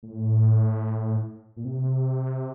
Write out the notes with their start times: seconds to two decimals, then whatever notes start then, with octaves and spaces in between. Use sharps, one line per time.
0.03 A2
1.57 A#2
1.65 C3